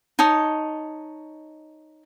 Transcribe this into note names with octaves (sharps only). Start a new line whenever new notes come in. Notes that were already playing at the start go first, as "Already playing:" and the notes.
D#4 C#5 A5 D#6